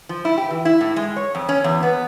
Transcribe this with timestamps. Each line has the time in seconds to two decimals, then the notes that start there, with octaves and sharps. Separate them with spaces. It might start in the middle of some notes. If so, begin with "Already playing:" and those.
0.09 F3
0.25 E4
0.38 G4
0.51 E3
0.65 E4
0.81 A2
0.96 G#3
1.16 C#5
1.35 F2
1.49 C#4
1.64 E2
1.83 B3